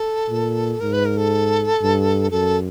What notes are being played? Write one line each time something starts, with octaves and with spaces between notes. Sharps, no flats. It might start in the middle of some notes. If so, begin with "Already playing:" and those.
Already playing: A4
A#2
G#2 A#4
B4
A#4
A4
G2
F#2 A4